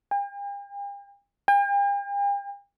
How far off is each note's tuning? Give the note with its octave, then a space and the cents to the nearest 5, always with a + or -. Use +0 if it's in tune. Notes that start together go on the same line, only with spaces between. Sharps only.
G5 +45
G5 +45